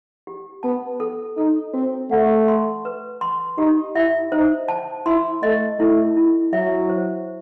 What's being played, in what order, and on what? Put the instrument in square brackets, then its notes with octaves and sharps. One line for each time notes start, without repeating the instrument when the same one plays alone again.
[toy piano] G4
[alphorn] B3 [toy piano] A5
[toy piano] A4
[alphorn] D#4 [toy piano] A4
[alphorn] C4 [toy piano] F#4
[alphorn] A3 [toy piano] F#5
[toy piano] C6
B4
C6
[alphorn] D#4 [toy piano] G4
[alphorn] E4 [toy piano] E5
[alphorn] D#4 [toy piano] C5
[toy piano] A5
[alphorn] E4 [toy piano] C6
[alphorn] A3 [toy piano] D#5
[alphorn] A3 [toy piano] E4
[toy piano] E4
[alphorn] F#3 [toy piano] E5
[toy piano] C5